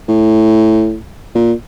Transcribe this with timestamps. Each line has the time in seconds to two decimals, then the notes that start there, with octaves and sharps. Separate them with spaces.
0.09 A2
1.35 A#2